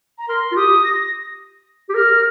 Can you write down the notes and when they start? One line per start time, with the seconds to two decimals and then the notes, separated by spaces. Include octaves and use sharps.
0.18 A#5
0.29 A#4 C6
0.52 F4
0.56 G4 D#6
0.84 A#6
1.89 G4
1.94 A#4 F6